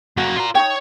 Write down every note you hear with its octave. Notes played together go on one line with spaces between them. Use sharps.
F#2 A#3 F#4
F4 A#5
D#4 F#4 C#5 G5